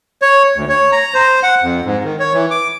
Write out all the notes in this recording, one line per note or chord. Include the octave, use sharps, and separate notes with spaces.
C#5
D2
C#5
A#5
C5
F#5
F2
G#2
D#3
C#5
E3
D6